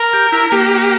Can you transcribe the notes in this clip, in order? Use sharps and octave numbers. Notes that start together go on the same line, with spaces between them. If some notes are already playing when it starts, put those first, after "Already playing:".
Already playing: A#4
G4
E4
A#3 G4